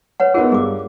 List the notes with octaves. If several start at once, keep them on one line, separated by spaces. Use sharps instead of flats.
B4 C#5 F#5
B3 D#4 F4 G#4 A#4 F#5
G2 G#4 D6